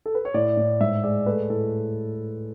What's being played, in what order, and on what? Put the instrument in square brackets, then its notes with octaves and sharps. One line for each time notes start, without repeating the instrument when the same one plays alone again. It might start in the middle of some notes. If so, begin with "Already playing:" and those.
[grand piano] A4
B4
C#5
A2 D5
A2
G#2 E5
G#3 D5
A3 B4
A2 A4